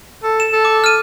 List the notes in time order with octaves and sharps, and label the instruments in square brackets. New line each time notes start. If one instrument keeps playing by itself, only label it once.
[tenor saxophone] A4
[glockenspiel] E7
[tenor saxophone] A4
[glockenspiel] D6
F6 D#7